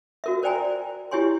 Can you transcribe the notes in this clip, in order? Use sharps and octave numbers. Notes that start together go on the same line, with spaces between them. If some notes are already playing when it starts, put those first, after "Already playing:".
F#4 A#4 E5
A#4 C5 D5 G5 G#5 A#5
E4 G4 C#5 G#5 C6